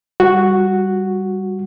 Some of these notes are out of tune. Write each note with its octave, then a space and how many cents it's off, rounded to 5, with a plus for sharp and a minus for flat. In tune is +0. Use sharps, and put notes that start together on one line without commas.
G3 +0 F#4 +0